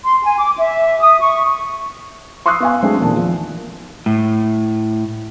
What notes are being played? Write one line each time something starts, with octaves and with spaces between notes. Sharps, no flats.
C6
G#5
D6
E5
D#6
C#6
C6 C#6 D#6 E6 F#6 C7
B3 F5 G#5
F#3 G#3 A3 C4 D4
E1 A#2 D#3 A5
F3
A2